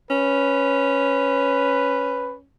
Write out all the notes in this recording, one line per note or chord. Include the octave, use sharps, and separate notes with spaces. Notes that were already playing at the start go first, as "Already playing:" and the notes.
C#4 B4